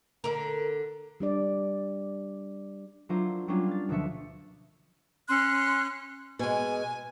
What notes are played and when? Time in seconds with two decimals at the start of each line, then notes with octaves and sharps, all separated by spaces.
0.24 D3 A#4
1.20 G3 D4 D5
3.09 F#3 D4 E4 F4 A#4 C5
3.48 F#3 G3 A#3 C#4 D4 F4
3.68 F6 A6
3.89 D2 B2 F3 E5 C#7
5.28 C#4 C6 F#6
6.39 B2 G#3 G#5